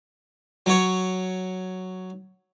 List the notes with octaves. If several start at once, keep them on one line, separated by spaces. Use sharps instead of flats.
F#3 C#5